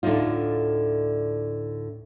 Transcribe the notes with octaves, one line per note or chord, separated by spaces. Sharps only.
D2 A2 D3 F3 D#4 F4